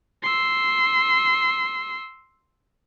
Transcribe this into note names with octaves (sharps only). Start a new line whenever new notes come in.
C6 E6